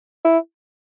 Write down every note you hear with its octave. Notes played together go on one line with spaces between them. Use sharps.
E4